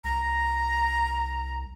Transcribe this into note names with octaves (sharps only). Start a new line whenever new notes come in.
C2 A#5